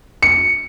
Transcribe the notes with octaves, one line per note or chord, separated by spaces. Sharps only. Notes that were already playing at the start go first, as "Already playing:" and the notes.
C#7